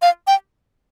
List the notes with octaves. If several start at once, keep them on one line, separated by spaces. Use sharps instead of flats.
F5
G5